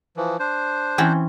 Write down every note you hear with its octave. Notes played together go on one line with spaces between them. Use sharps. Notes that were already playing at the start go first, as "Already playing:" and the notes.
E3 F3
D4 C5
E3 C4 C#4